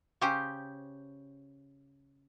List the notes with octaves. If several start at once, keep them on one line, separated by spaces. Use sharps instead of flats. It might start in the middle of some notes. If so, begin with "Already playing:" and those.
C#3 C#4 G4 C5